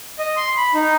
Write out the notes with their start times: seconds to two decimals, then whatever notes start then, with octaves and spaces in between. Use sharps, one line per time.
0.19 D#5
0.37 C6
0.57 B5
0.74 D#4